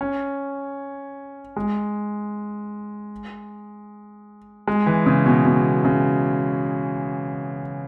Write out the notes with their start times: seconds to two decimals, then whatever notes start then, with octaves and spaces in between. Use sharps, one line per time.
0.01 C#4
1.56 G#3
4.67 G#3
4.86 E3
5.06 C#3
5.26 B2
5.45 B2
5.85 C#3